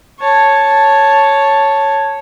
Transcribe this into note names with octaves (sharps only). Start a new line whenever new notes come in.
C#5 A5